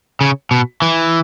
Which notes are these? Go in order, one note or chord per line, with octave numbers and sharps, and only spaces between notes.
C#3
B2
E3